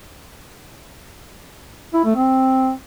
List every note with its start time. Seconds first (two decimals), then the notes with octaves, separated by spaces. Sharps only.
1.94 E4
2.05 A3
2.16 C4